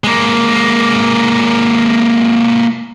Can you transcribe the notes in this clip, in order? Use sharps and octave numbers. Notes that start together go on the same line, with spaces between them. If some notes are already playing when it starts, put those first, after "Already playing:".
G#3 A#3